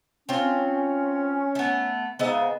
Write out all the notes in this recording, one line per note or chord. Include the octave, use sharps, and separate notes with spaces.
C4 C#4 F4
A3 B3
G#2 C#3 B3 D#5 E5